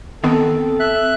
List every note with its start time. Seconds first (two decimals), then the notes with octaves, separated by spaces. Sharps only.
0.24 D#3 B3 C4 A4
0.80 E5 F#6